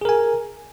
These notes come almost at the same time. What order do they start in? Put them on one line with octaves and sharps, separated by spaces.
G#4 A#4 G#5